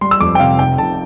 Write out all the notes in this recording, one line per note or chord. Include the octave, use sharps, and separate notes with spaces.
G3 C6
E6
F2 D6
G5
C3 F5
F1 G5
F1 A5